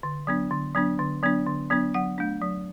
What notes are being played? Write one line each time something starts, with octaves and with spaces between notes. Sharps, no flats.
D3
F#3 B3 D4
D3
F#3 B3 D4
D3
F#3 B3 D4
D3
F#3 B3 D4
F#3 F#5
A3 D4
F#3